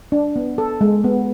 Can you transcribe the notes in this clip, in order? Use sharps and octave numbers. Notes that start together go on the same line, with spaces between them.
D4
B3
A4
G#3
B3